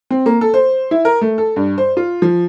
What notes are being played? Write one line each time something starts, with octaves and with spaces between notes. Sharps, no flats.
C4
A#3
A4
C5
E4
A#4
A3
A4
G2
C5
F4
F3